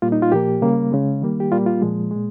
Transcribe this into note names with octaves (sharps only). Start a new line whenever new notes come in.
A#2 G3 A#3 F4
D#4
F4
A#2 F3 A#3 G4
C#3 G3 A#3
C#3 G#3
D#3 G3 A#3
G4
A#2 G3 A#3 F4
F4
A#2 F3 G#3
A#2 G#3